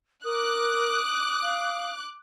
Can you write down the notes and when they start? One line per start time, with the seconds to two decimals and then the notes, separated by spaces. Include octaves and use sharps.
0.25 A#4 D6 D#6 F#6
1.43 F5